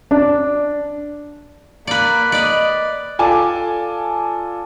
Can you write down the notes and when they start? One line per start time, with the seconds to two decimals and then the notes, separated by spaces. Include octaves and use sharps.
0.11 D4
1.87 A#3 B4 D5
2.32 B4 D5 D#5
3.19 F4 A4 D5 G#5 A5 D6